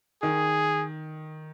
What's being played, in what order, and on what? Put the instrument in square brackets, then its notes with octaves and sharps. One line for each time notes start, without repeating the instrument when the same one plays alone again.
[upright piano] D#3 [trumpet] G#4